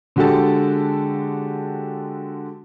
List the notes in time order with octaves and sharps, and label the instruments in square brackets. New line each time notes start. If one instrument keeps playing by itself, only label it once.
[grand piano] D3 G#3 F#4 G4 A4 A5